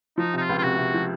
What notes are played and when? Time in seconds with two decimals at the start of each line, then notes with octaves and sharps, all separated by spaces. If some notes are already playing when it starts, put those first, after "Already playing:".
0.18 F3 D#4
0.34 C3 D#4
0.40 F4
0.49 C#2
0.58 F4
0.63 C3 F#4
0.78 C3
0.94 F3